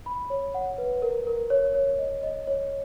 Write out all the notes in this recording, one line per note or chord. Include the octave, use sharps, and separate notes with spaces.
B5
C#5
F#5
B4
A#4
A#4
C#5
C#5
D#5
D#5
C#5